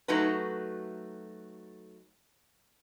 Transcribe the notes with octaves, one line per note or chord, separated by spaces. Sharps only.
F#3 A3 D#4 F#4 B4